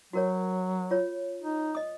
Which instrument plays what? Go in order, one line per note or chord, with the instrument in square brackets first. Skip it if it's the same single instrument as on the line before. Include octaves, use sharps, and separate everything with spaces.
[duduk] F#3 [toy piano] F#4 A#4 C#5
[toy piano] F4 C#5
[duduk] D#4
[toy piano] D#5 D#6